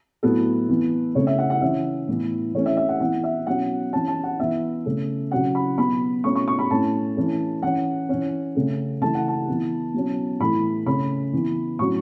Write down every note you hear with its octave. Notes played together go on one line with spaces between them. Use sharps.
A2 F#3 B3 A4
E3 B3
C#3 A3 C#4 C#5
E5
F#5
F#5
E3 C#4 E5
A2 E3 B3
E3 A3 C#4 C#5
E5
E5
F#5
E3 B3 F#5
E5
B2 F#3 C#4 F#5
E3 C#4 A5
A5
F#5
E3 B3 E5
C#3 A3 C#4
C#3 F#3 C#4 F#5
B5
B2 F#3 B3 B5
B2 A3 C#4 C#6
C#6
C#6
B5
A2 A3 C#4 A5
E3 A3 C#4
E3 C#4 F#5
E3 C#4
C#3 A3 C#4
C#3 E3 A3 A5
F#5
A5
E3 B3
B2 F#3 C#4
A2 E3 A3 B5
C#3 A3 C#4 B5
E3 B3
A2 F#3 C#4 C#6